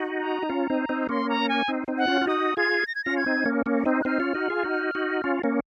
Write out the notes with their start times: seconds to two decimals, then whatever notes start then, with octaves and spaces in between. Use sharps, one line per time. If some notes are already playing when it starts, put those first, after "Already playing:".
Already playing: D#4 F#4
0.19 A#5
0.43 D#4
0.49 C#4 F4
0.70 C4 D#4
0.89 C4 D#4
1.09 A#3 C#4 C6
1.29 A#5
1.49 G#5
1.68 C4 D#4
1.88 C4 D#4
1.98 F#5
2.07 C#4 F4
2.21 F4
2.27 D#4 F#4 D#6
2.57 F4 G#4 G#6
2.87 A#6
2.95 G#6
3.04 C#4 F4 A#6
3.17 G#6
3.26 C4 D#4
3.46 A#3 C#4
3.66 A#3 C#4
3.85 C4 D#4
4.02 F#6
4.05 C4 D#4 F6
4.20 C#4 F4
4.34 D#4 F#4
4.50 F4 G#4
4.64 D#4 F#4
4.95 D#4 F#4
5.24 C#4 F4
5.44 A#3 C#4